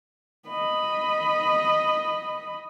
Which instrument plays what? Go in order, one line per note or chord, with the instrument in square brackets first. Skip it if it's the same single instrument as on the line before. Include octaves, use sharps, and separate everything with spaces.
[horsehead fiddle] D#5 B5